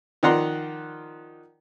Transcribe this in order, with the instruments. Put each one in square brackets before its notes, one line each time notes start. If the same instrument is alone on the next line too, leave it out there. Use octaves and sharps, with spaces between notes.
[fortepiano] D#3 F3 D5 F#5 A#5 C6